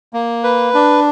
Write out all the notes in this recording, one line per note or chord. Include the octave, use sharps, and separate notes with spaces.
A#3
B4
D4